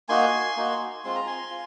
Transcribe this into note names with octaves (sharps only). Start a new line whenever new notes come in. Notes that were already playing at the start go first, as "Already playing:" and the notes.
A#3 D#4 F#4 G#5 C6
A#3 D#4 F#4
G#3 C4 F4 C6
A#5
G#5 C6
F4